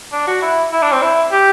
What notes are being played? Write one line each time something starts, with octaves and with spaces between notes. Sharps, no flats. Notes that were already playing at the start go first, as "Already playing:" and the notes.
D4
F#4
E4
E4
D4
C4
E4
G4